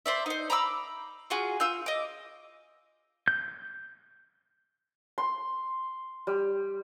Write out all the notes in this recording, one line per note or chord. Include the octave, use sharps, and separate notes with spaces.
C5 D5 E5
D#4 C5
A#5 B5 D6 E6
F4 F#4 G#4
F4 E6 G6
D#5 D6
G6
C6
G3